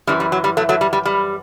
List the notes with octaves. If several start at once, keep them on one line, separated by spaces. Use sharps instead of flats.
F#2 E3 G3
G3
F#3
G3
F#3 A3
F#3 A3
G3
G3
G3